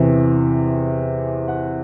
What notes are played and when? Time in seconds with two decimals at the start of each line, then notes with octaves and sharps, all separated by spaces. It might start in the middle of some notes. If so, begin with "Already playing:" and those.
Already playing: E2 C3 E3
1.48 F#5